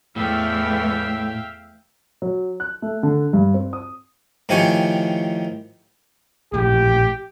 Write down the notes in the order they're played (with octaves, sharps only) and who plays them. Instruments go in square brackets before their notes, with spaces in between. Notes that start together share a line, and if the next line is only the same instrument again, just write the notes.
[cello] E2 A3 [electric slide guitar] A2 [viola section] E5 F5 G5
[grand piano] F#3
F#6
A3
D3
G2
C4
D#6
[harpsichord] A2 D#3 F3 G4 G#5 C#6
[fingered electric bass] A#1 A2 [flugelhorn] G4